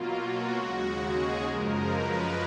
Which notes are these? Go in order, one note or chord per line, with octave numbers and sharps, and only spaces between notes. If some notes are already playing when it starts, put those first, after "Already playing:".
Already playing: B2 F#3 A#3 F4
F#4
D#2 C#3 G#3 F#4
G#4
F#2 C#3 F3 G#3 A#4
B4